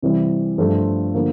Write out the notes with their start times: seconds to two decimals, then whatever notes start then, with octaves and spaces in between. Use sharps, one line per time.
0.02 C3 E3 G3 C4
0.58 G2 F3 A3 D4 F4
1.15 D3 F3 A#3